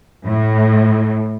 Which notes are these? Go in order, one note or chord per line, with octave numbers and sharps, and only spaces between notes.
A2